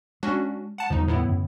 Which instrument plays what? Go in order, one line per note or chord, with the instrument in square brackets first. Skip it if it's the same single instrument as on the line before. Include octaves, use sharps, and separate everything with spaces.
[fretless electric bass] G#3 [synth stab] C#4 D4 F#4
[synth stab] F#5 A5
[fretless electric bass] E2 D3 G3 [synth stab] F3 D#4
[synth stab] A2 B3 E4
[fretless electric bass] F#2 D3